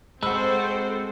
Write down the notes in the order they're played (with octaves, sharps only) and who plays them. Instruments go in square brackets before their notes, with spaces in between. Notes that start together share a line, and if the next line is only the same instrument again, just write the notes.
[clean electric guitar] G#3 F#4 [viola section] C4 A4 C5 [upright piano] B5 E6